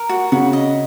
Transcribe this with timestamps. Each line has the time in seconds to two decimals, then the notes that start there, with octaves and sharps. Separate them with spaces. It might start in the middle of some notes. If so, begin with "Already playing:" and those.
Already playing: A#4
0.09 F#4
0.32 C#3 F#4
0.53 D#5